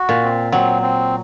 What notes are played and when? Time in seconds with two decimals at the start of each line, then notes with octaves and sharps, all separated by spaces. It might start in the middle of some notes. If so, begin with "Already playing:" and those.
Already playing: F#4
0.09 A#2
0.23 C4
0.52 F#3 C4
0.82 C4